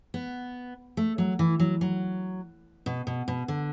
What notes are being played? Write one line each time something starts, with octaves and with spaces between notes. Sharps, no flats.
B3
A3
F#3
E3
F#3
F#3
B2
B2
B2
D3